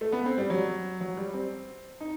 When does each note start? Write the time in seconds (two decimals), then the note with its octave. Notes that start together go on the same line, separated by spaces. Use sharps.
0.01 A3
0.12 B3
0.26 C4
0.38 G3
0.50 F#3
1.01 F#3
1.17 G3
1.33 C4
2.01 D#4